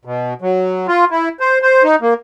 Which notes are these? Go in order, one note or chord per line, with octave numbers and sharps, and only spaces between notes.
B2
F#3
F4
E4
C5
C5
D#4
A#3